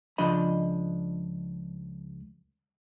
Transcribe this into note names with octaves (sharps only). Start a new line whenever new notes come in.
C#2 F3 D4 D#5 B5